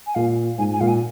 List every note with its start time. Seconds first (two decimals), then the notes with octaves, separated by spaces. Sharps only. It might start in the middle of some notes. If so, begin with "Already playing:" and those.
0.07 G#5
0.15 A#2 F5
0.58 G#2 G#5
0.73 G#5
0.81 A#2 F5
0.88 G#5